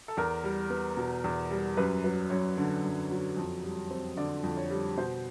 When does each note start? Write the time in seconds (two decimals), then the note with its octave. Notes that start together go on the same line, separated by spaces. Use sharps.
0.08 A4
0.17 E2 A#4
0.44 G3
0.70 B3
0.97 B2
1.24 E2
1.51 G3
1.77 F#2 B4
2.04 F#3 B4
2.30 F#2 C#5
2.57 D3
2.84 F#2
3.10 F#3
3.37 F2
3.64 G3
3.91 C4
4.17 D3 D5
4.43 F2
4.57 C#5
4.70 G3
4.97 B2 C5